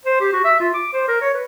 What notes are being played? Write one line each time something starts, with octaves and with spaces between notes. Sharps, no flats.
C5
G4
F#4
E5
F4
D6
C5
A#4
C#5
B4